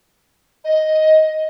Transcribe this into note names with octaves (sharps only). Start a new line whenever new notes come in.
D#5